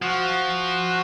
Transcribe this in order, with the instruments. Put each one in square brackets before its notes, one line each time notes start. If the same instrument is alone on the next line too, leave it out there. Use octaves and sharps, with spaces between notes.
[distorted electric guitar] F3 [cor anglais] F#4